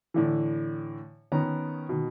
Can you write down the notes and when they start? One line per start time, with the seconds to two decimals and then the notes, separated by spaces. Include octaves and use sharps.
0.14 A2 D3 E3
1.32 D#3 B3 C#4 A#5
1.89 B2 D#3